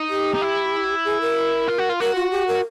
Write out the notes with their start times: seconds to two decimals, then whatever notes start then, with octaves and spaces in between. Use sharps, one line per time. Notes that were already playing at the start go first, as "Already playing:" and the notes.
Already playing: D#4
0.09 G4
0.34 D#4
0.42 E4
1.05 G#4
1.21 A#4
1.68 F4
1.78 F#4
1.89 F4
2.00 F#4 A#4
2.15 F4
2.31 G4
2.47 A#4